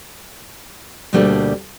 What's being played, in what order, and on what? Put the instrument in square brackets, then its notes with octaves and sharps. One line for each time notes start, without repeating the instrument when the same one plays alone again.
[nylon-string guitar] D2 B2 G3 A3 A#3 D4